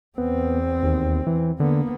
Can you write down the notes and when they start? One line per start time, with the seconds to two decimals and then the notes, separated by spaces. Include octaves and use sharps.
0.18 E2 B3 C4
0.83 D#2
1.27 E3
1.60 D3 A#3 B3